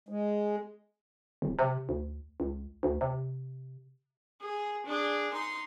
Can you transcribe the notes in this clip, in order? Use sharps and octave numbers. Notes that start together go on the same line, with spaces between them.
G#3
D1
C3
D2
C#2
D2
C3
G#4
D4 G#4
D#4 C6